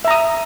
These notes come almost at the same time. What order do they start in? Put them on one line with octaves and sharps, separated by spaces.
E5 A#5 D#6